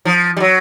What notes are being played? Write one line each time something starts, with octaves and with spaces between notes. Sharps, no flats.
F3
G3
F#3